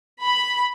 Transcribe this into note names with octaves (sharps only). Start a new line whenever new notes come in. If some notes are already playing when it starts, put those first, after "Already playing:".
B5